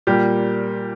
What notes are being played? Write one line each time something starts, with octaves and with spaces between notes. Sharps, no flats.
A#2 G3 A#3 G4